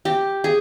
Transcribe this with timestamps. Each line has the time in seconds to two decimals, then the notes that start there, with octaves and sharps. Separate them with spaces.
0.05 G4
0.44 G#4